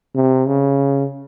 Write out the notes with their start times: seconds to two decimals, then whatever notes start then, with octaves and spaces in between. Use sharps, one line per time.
0.15 C3
0.47 C#3